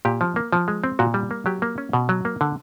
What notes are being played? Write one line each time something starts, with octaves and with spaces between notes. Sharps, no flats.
A#2 G4
F3
A#3
F3
G#3
C4
A#2 F#4
G3
A#3
F#3 G4
A#3
C#4
B2
F#3
A#3
D3